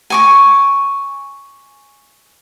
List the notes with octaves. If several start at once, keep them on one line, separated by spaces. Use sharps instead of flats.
G#5 C#6 D6